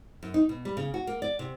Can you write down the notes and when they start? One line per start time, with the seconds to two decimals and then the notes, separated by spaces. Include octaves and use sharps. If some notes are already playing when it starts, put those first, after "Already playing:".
0.23 F#2
0.34 D#4
0.49 B2
0.65 G3
0.77 C#3
0.94 F#4
1.07 A#3
1.22 D5
1.39 C3